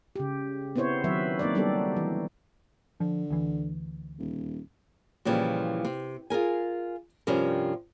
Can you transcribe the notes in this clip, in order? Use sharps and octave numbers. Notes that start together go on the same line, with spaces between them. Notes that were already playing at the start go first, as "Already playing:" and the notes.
C#3 G4
B3 C4 E4 C5 C#5
D#3 F#3 C4 B4 E5
A#3 C4 D#4 C#5 D5
G3 B3 D4 D#4 G4 A4
E3
D3 F3
D2 E3
D#1
A#2 C#3 E3 F3 G3
C3
F4 G#4 A#4 G#5
G2 C3 F3 G3 C#4 A#4